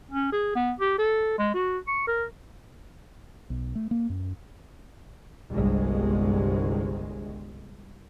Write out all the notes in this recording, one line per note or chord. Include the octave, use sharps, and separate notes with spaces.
C#4
G#4
B3
G4
A4
G#3
F#4
C#6
A#4
B1
A3
A#3
F#2
G1 C2 G#3